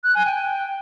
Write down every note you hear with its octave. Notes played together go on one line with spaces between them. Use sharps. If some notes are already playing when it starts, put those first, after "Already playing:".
F#6
G#5
G5